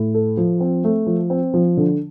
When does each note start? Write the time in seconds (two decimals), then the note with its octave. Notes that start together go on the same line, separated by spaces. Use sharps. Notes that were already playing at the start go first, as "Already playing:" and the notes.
Already playing: A2
0.14 A4
0.37 F3
0.60 C4
0.84 A3
1.07 F3
1.30 C4
1.54 F3
1.77 D3